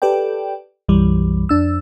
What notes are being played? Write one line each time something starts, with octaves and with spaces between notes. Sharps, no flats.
G4 A4 B4 D5 G5
B1 F#2 E3 G3
F2 D4 E6